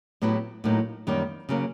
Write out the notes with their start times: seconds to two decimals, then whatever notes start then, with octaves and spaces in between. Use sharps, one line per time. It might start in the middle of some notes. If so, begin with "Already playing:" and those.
0.22 A2 F#3 B3 E4 G4
0.64 A2 F#3 A#3 D#4
1.07 F#2 D#3 G3 A#3
1.49 C#3 F#3 A#3